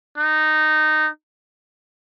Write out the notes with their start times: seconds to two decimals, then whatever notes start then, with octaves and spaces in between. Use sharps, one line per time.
0.18 D#4